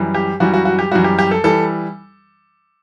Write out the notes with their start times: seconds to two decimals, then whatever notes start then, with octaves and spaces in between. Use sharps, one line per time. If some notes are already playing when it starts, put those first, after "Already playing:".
Already playing: F#2 E3 G3
0.14 G4
0.40 F#2 E3 G3 F#4
0.54 F#4
0.65 F#4
0.79 G4
0.91 F#2 E3 G3 F#4
1.04 G4
1.19 G4
1.31 A4
1.44 E3 G3 A4